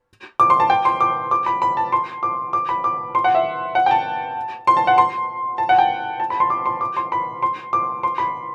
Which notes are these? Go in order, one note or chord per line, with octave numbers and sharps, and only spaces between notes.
D6
C6
A5
G5
C6
D6
D6
B5
B5
A5
C6
D6
D6
B5
D6
C6
F#5
E5
F#5
G5
A5
C6
A5
F#5
C6
A5
F#5
G5
A5
B5
C6
D6
C6
D6
C6
B5
C6
D6
C6
B5